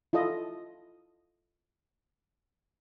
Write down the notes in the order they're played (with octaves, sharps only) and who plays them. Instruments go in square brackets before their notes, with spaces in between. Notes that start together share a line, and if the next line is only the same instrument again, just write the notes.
[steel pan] E4 F4 A4 D#5